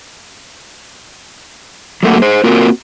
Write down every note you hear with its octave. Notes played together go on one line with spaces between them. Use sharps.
F#3 A3 A#3 F#4
G#4 C5
A#3 C4 F4 F#4 A#4